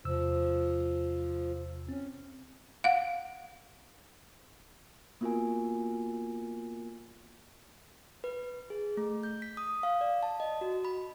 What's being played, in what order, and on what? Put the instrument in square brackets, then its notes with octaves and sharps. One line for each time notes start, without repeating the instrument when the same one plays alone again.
[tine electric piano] E2 C3 E6 [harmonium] F3
[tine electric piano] C4 [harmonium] C#4
[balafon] F5 F#5
[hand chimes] A#3 B3 F4 F#4 A#4 G#5
B4
G#4
A3
G6
B6
D#6
F5
D5
A5
D#5
F#4
B5